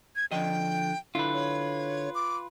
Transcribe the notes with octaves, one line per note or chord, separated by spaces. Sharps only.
G#6
D3 F3 D#5 G5
D3 E4 F4 B4
C#5
D6